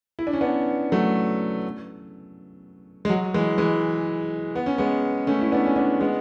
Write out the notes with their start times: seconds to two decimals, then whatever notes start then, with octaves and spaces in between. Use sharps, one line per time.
0.19 E4
0.27 D4
0.33 C#4
0.41 B3 D4
0.92 F#3 A3
3.05 G#3
3.10 F#3
3.34 E3 G#3
3.58 E3 G#3
4.55 B3
4.66 C#4
4.78 G#3 B3
5.27 A3 C#4
5.41 E4
5.52 B3 D4
5.66 C#4
5.76 B3 D4
6.00 G#3 B3